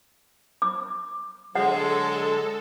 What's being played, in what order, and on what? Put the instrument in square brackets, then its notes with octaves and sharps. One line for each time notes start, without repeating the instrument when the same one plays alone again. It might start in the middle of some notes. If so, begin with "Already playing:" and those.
[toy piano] D6
[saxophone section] D3 F#3 G#3 [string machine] A4 [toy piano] F#5